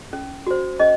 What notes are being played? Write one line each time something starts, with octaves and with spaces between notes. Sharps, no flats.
C#4
F#4 C5
C#4 D#5